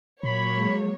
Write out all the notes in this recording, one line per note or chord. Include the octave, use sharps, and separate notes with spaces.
A#2 F#3 A#3 C#5 B5
G#3